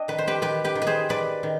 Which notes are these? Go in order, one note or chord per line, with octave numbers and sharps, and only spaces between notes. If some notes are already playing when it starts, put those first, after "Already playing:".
Already playing: D4 D#5 G5
D#3 B4
C5
G4 B4
D#3 G4 B4
G4 B4
D#3
B4
G#4 C5
D#3 B4 D5
D#3